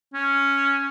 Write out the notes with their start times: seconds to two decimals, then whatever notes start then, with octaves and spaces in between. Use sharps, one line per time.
0.14 C#4